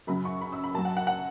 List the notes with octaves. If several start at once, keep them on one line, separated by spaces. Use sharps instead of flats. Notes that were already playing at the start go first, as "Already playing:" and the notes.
F#2 C#3 F#3 B5
C#6
B5
E6
B5
F#2 F#3 A5
F#5
F#5
F#5